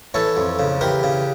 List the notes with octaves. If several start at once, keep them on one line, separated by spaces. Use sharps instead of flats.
E3 A4 C#5
F2
C#3
E3 G4 A#4
C#3